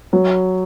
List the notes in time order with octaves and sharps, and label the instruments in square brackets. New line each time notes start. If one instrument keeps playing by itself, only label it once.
[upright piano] F#3